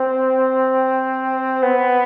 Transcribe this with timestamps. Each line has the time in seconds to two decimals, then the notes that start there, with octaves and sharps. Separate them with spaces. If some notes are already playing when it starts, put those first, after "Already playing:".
Already playing: C4
1.62 B3